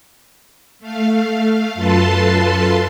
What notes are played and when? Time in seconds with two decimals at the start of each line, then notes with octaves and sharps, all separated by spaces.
0.80 A3 F5
1.74 F#2 F4 A4 B4 A5 C6